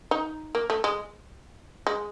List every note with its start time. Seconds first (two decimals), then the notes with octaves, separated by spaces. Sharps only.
0.11 D#4
0.55 A#3
0.70 A3
0.84 G#3
1.87 G#3